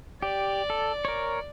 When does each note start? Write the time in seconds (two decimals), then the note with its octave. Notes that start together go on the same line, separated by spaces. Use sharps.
0.22 G4 D5
0.70 A4
1.05 A#4 C#5